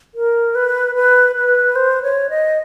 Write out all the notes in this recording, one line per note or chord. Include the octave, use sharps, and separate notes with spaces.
A#4
B4
B4
B4
C5
C#5
D#5